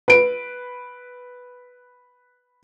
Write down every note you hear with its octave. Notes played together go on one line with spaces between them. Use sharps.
B4 D7